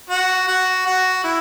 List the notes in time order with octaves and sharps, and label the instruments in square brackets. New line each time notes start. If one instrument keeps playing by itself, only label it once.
[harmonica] F#4
F#4
F#4
E4